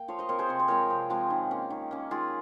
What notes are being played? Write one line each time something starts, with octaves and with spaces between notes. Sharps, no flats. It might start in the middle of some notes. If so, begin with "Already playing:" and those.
Already playing: A#3 G5
F3 C#5 F5
C5 D#5
C4 A#4 C#5
G#4 C5
C3 C#5
C5
F3 G#3 C4 A#4 C#5
C3
F3 G#3 C4
D#3
A#3 C#4
D#3
A#3 C#4
D#3 F4 G#4